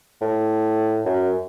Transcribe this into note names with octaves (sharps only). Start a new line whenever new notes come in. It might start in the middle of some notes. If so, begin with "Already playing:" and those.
A2
F#2